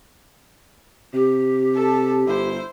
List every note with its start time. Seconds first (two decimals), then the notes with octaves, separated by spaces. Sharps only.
1.14 C3 G4
1.74 A4 A5
2.27 G1 E4 C5